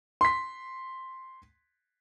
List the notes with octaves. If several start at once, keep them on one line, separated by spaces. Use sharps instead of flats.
C6 B6